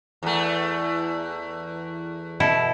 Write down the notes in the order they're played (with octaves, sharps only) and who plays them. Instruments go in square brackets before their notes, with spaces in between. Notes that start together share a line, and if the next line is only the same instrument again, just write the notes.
[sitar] E2 A3
[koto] B2 E4 A4